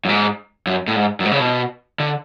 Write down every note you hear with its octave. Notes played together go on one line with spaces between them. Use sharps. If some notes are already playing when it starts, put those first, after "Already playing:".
F#2
G#2
F#2
A2
G#2
F#2
G#2
C#3
B2
D3